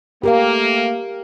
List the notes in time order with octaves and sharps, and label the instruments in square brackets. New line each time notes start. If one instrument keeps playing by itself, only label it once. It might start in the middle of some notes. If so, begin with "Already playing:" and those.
[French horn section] A3 A#3 [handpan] G4 A#4 F5